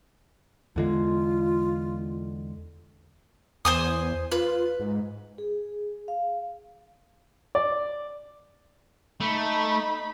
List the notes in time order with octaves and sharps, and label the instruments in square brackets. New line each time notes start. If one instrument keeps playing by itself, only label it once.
[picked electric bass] E2 D3 G#3 [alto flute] F4
[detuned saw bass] E2 [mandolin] C5 G#5 D#6
[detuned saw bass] F4 [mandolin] B4
[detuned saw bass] G#2
[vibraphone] G#4
F5
[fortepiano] D5
[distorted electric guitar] A3 [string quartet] D#4 B5